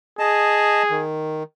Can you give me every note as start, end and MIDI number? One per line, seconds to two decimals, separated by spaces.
0.19 1.03 68
0.19 0.83 75
0.19 0.83 81
0.90 1.43 51